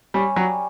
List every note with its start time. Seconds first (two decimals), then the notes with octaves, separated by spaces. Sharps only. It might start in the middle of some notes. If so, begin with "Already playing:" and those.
0.14 G3 C#4
0.36 F#3 G3